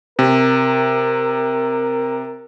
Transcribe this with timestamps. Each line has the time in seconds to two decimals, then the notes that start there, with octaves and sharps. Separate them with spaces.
0.19 C3 A#4